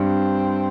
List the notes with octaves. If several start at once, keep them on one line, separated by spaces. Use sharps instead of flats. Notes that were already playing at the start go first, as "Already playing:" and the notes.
Already playing: G2 C4